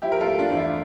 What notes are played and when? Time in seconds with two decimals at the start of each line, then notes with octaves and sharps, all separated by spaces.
0.02 F3 E4 G4
0.12 A#4
0.20 F4 A4
0.27 A3
0.38 D4 F4
0.51 E2
0.57 E4